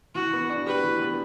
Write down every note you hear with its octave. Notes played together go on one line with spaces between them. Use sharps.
E3 F#4
B3
D4
G4 B4
E3
B3